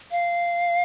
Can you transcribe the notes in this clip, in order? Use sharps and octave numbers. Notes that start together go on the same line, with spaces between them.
F5